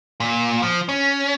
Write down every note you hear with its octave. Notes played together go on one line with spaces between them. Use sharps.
A#2
F3
C#4